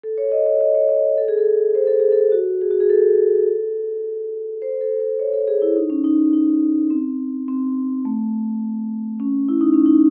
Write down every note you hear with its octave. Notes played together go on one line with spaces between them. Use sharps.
A4
C#5
D#5
C#5
D#5
C#5
D#5
A4
G#4
A4
C5
A4
G#4
A4
F#4
G#4
F#4
G#4
A4
C5
A4
C5
C#5
A4
G#4
E4
D#4
C#4
D#4
D#4
C4
C4
A3
C#4
E4
D#4
C#4
D#4